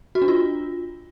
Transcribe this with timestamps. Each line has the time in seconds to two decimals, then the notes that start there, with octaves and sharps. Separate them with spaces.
0.15 F#4
0.22 D4
0.28 F4